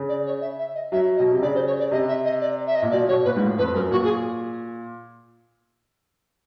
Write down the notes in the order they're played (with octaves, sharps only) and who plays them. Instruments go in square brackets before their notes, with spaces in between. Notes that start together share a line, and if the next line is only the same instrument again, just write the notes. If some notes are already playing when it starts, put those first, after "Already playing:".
Already playing: [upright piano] C#3
[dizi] D5
C#5
E5
E5
D#5
[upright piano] F#3 [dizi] E5
[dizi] D#5
[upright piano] B2
C3
[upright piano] C#3 [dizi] D5
[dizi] C5
C#5
D5
[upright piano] C3 [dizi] D#5
[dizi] E5
D#5
D5
E5
D#5
[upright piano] A#2
[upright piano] B2 [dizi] D5
[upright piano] B2 [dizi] C#5
[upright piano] A#2 [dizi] B4
[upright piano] G#2
A2
[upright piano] F2 [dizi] B4
[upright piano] F#2 [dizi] A#4
[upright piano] A#2 [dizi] F#4
[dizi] G#4